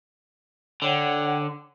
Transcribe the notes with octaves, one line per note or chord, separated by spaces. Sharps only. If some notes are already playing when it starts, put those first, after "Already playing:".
D3 C#5 F#5 G5